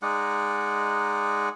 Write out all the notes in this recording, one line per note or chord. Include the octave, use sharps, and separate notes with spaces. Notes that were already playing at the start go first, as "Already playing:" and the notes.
G#3 D#4 D5 F#5